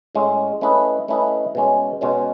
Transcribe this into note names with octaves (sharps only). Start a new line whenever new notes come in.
A2 G#3 C#4
A3 C#4 E4 B4 D#5
A3 C#4 E4 B4 D#5
B2 G#3 C#4
B2 G#3 C#4